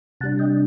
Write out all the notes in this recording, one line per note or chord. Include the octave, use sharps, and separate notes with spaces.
C3 G3 D4 F#5 A5
D#5 G5